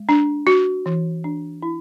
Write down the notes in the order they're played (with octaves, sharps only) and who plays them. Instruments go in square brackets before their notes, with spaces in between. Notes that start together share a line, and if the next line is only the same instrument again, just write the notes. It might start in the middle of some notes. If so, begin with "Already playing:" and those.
Already playing: [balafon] G#3
D4
F#4
E3
D4
E4